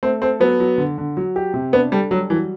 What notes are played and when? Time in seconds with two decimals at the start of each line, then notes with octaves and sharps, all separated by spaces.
0.03 A3 C4
0.22 C4 A4
0.40 F#3 B3
0.60 F#3
0.78 D3
0.98 D3
1.17 F#3
1.36 G4
1.54 C3
1.73 B3 D4
1.92 G3 A4
2.11 F#3 G3
2.30 E3 F#3